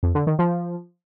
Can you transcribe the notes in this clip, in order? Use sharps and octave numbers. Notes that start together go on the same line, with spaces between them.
F2
D3
D#3
F3